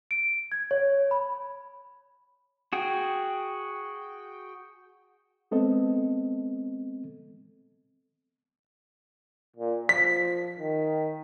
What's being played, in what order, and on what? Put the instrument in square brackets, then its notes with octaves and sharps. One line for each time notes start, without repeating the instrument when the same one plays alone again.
[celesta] D7
G#6
C#5
B5
[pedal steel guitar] F#4 G#4 G5
[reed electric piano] G#3 B3 C4 A4 D#5
[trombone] A#2
[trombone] F3 [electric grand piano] B6
[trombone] D#3